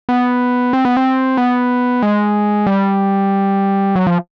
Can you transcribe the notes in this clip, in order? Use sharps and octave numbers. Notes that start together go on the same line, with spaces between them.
B3
C4
B3
C4
B3
G#3
G3
F#3
F3